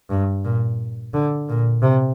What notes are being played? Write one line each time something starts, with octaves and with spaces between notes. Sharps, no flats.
G2
A#2
D3
A#2
C3